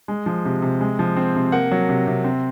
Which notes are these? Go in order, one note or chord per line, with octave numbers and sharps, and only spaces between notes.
G#3
F3
C3
C3
G#3
F3
C4
C3
A#3 F#5
F#3
C3
C3
C4